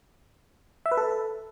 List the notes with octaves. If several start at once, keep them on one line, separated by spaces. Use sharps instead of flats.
E5
B4
A4